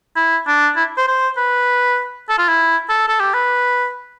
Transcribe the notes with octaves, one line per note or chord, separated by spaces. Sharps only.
E4
D4
E4
C5
C5
B4
A4
F4
E4
A4
A4
G4
B4